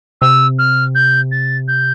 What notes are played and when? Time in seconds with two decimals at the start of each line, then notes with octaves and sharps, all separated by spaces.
0.21 C3 E6
0.59 F6
0.95 G6
1.32 A6
1.68 G6